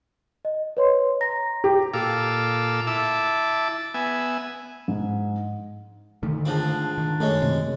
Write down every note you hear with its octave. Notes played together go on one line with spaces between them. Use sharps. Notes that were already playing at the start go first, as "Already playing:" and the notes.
D#5
B4 C#5 C6
A#5 A#6
G4
A#2 A4 F5 D6 E6
E4 E5 A5 D6
B3 E5 G#5
G#2
D3 D#3 A3
G#2 F3 C4 D4
D#3
F#2 G#3 A3 C#4
C3